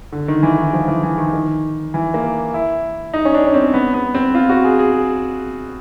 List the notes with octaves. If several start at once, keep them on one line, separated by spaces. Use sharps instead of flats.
D3
D#3
E3
D#3
F3
E3
E3
D#3
D#3
E3
A#3
E4
D#4
C#4
D4
C#4
C4
B3
B3
C4
F4
F#4
G#4
G#4